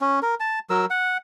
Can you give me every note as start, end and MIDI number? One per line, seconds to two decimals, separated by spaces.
0.01 0.20 61
0.22 0.35 70
0.40 0.59 81
0.70 0.86 54
0.70 0.86 70
0.70 0.86 88
0.90 1.17 78